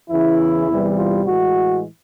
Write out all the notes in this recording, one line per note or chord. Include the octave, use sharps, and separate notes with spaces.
E2 C#3 E3 E4
E2 C3 E3 G3
F4
A2 E3 G#3 F#4